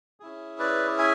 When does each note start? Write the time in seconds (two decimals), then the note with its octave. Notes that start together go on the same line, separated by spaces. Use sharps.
0.20 C#4 E4 G#4
0.59 B4 D5
0.99 E5 G#5